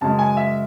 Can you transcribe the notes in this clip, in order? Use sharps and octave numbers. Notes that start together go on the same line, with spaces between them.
F#2 C#3 G#3 A5
G#5
E5